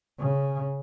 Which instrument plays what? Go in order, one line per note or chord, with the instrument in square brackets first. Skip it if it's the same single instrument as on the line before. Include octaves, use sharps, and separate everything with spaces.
[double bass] C#3